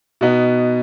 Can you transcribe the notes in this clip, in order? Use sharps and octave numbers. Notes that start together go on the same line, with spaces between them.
B2 B3 D#4